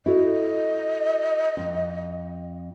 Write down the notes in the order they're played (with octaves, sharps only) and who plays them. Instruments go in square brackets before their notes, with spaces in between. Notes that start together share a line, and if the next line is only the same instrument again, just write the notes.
[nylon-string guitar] E4 F#4 A4 [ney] D#5
[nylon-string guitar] F2